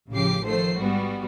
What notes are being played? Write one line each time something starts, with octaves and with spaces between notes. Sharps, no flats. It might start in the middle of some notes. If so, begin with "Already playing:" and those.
A1 C#3 F3 G4 D6 C7
D#3 F3 A3 C5 C7
G#2 G3 B3 F#4